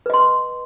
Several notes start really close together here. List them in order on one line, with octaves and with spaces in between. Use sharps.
B4 D#5 C6